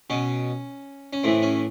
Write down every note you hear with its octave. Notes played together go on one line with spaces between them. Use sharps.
B2 C#4
C#4
A2 E3 C4
C#4